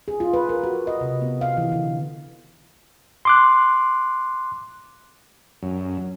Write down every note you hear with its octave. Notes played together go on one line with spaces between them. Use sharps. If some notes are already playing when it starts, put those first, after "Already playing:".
G#4
F4
B4
A#4
F#4
D#5
C3
B3
F5
E3
D3
C6 D6 F#6
F#2